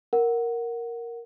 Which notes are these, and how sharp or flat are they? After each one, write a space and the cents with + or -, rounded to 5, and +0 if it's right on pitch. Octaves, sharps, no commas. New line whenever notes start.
A#4 +0 F#5 +0